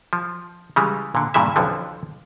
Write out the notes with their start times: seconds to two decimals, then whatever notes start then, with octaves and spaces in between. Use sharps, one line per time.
0.13 F3
0.76 C#3 E3 G3 G#3
1.15 A#2 D3
1.34 G2 A#2 C#3 E3 E5
1.56 B1 F2 D3 E3 F3